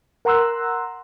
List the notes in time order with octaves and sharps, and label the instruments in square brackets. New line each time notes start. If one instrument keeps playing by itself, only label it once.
[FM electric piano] A#4 F#5 A#5 C6 E6 F#6